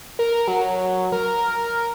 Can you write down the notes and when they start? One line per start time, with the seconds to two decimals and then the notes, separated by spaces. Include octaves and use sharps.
0.19 A#4
0.48 F#3
1.12 A#4